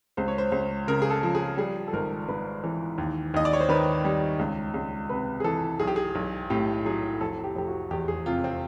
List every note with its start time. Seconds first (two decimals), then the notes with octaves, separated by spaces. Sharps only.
0.17 C#2 C5
0.28 C#5
0.38 C5
0.52 C#2
0.88 C#3 A#4
1.02 G#4
1.10 A4
1.23 F3
1.35 G#4
1.57 G3 G#4
1.88 A4
1.93 G#1 A#4
2.28 G#2 B4
2.64 E3
2.98 D#2
3.34 D#2 D#5
3.45 D5
3.53 C#5
3.60 C5
3.69 D#3 B4
4.05 G3
4.39 C#2
4.74 C#2
5.10 C3 B4
5.40 G#4
5.44 E3 A4
5.80 B1 G#4
5.87 G4
5.96 G#4
6.15 B1
6.50 A2 G4
6.85 F#3 G#4
7.21 F1 A4
7.44 G4
7.55 F1 G4
7.68 F#4
7.91 E2 G4
8.08 G#4
8.26 C3 F4
8.44 C4